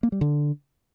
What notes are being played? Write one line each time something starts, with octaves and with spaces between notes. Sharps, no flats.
A#3
G3
D3